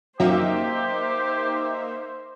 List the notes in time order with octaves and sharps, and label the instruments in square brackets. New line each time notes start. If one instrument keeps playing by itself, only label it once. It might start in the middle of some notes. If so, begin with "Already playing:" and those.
[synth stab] F#2 [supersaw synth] A#3 D#4 E5 [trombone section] G4 [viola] C5